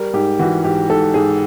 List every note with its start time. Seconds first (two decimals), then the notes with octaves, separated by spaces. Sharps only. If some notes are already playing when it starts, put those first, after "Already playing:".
Already playing: G3 A#4
0.13 G#2 G4
0.39 E3 F#4
0.64 G#2 G4
0.89 G#2 A4
1.14 G#2 G#4